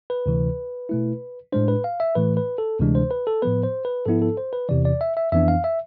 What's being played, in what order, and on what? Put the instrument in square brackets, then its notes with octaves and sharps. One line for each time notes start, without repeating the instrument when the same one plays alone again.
[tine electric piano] B4
D2 C3 E3
B2 A3 E4
A2 G#3 D4 C5
B4
F5
E5
A2 E3 A3 B4
B4
A4
D2 C3 E3 G#3 D4
C5
B4
A4
A2 F3 B3 B4
C5
B4
G#2 F3 B3 E4 A4
A4
C5
B4
E2 C3 E3 D5
D5
E5
E5
F2 E3 B3 D4 E5
F5
E5